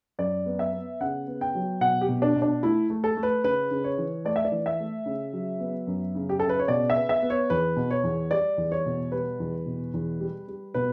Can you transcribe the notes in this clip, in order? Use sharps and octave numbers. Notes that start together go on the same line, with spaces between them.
F#2 D5
B3
E5
B3
C#3 F#5
B3
G5
F#3
B2 F#5
G4
B2
D4
B2
D4
A3 E4
A3
A4
A3
B4
C#3 B4
C#3
C#5
E3
A3 D5
E5
D5
E3
E5
A3
C#3
F#3
B3
F#2
C#3
G4
C#3 A4
B4
C#5
B2 D5
E5
B3
E5
B3
C#5
E2 B4
B2
C#5
E2
G3 D5
E2
C#5
B2
G3 B4
E2
B2
E2
G3
G3
B2 B4